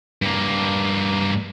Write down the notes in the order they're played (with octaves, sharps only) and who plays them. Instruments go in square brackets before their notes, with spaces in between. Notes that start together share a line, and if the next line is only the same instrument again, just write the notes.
[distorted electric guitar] G2 A#3